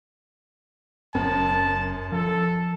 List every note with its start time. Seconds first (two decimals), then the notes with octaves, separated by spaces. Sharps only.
1.15 F#1 F#2 C4 A5
2.12 F3 A4